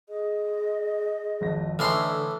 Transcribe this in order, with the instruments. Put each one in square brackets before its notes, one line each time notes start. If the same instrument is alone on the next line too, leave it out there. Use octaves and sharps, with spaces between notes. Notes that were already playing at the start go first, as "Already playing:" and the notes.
[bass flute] G#4 [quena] D#5
[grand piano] G#1 F2 A#6
[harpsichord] A2 E3 C6 [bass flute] D3 [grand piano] F6